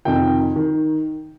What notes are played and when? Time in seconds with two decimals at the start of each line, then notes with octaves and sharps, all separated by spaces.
0.05 F2 C3 D#3 G5
0.56 D#3